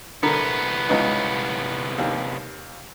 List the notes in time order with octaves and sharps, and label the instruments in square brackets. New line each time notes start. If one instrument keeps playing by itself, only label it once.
[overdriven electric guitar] C2 B3 [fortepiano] D3 A#4
[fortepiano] C#2 D#4 B4
D#2